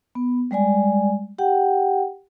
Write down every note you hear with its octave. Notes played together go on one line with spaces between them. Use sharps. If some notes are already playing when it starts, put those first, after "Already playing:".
B3
G3 G#3 D5 G#5
G4 F#5 G5